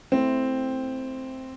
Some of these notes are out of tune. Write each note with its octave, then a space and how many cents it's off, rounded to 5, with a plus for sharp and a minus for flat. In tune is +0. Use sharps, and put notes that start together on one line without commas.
A3 +0 C4 +0 E4 -5